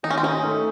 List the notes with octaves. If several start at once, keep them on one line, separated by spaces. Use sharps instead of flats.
D#3 D#4
C#4
C4
C#4 D#4
A3